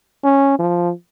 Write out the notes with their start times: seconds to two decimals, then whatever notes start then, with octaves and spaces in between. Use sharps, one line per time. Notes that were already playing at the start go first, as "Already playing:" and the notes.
0.24 C#4
0.59 F3